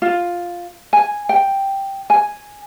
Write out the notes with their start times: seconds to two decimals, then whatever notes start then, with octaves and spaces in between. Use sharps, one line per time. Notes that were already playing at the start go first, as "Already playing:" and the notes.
0.02 F4
0.93 G#5
1.29 G5
2.10 G#5